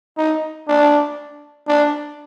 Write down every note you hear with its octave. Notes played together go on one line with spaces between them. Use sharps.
D#4
D4
D4